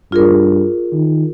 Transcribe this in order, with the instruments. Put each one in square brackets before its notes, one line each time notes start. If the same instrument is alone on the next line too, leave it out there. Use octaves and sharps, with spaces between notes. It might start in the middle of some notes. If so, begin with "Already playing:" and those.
[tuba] G2 [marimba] F4 G#4 A#4
[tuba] D#3